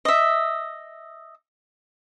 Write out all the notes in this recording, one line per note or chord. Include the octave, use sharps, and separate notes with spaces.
D#5 E5